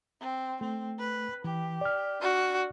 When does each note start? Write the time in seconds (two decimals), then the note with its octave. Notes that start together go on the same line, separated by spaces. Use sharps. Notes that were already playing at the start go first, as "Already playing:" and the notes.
0.20 C4
0.61 A3 C4
0.99 B4
1.44 E3 G4
1.81 D5 F6
2.22 D4 F#4